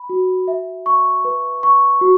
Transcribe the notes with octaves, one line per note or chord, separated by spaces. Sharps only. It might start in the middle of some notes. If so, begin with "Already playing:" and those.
Already playing: B5
F#4
E5
C#6
B4
C#6
F#4